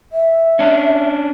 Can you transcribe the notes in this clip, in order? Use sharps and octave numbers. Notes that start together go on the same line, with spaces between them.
E5
C#4 D4